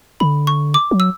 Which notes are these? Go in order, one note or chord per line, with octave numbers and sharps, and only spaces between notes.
D3 B5
C#6
D6
F#3
E6